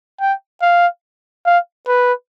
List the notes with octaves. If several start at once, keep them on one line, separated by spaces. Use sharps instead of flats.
G5
F5
F5
B4